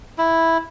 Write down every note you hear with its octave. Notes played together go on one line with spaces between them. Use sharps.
E4